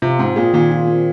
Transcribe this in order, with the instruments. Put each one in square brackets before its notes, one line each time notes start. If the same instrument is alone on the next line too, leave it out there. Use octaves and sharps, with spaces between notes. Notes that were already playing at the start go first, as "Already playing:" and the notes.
[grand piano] C3 [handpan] F4
[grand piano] G#2 [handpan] C4
[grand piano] A#2 [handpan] G#4
[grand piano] A#2 [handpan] D#3
[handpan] F4
C4